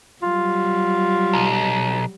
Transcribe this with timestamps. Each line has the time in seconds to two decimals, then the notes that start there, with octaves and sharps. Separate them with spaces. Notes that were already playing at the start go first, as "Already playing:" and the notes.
0.22 F#3 G3 F4
1.33 B1